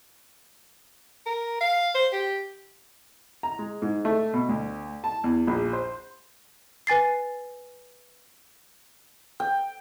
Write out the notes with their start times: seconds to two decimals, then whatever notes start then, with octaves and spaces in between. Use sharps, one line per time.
1.26 A#4
1.61 F5
1.95 C5
2.13 G4
3.43 A#5
3.59 G#3
3.82 G#2
4.05 A3
4.34 B2
4.49 D2
5.04 A5
5.24 E2
5.47 A#1
5.73 C5
6.87 B4 G#5 A6 C7
9.40 G5